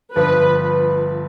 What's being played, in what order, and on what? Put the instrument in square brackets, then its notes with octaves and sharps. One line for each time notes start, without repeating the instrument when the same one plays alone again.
[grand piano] G1 G2 F3 [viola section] B4